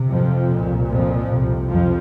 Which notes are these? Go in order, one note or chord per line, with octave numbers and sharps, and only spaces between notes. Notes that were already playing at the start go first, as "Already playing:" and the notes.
Already playing: C3
F2 F3
C2 A#2
F2 F3
C2 C3
F2 F3